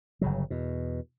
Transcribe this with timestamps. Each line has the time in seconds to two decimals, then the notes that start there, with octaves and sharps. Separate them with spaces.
0.21 G1 C#3 F#3
0.50 E2 B2